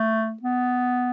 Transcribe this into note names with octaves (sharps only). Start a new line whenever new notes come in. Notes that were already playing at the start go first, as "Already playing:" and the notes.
Already playing: A3
B3